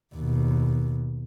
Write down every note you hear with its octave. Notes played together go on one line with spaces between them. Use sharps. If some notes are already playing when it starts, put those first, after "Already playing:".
D#2 B2